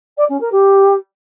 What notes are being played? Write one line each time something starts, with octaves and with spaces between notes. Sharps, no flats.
D5
C#4
A#4
G4